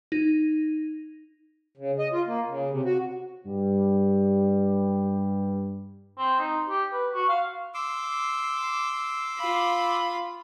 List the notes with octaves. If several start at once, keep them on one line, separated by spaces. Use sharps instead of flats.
D#4
C#3
D#5
F4
A#3
C#3
C3
F#4
G2 G3
C4
D#4
G4
B4
F#4
F5
C6 D6 E6
F4 B5